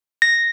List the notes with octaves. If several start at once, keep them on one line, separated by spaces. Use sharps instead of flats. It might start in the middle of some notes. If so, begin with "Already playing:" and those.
A#6